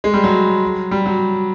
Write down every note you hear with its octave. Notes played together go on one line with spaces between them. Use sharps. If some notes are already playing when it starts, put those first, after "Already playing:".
G#3
G3
F#3
G3
F#3